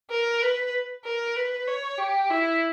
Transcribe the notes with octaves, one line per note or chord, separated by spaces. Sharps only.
A#4
B4
A#4
B4
C#5
G4
E4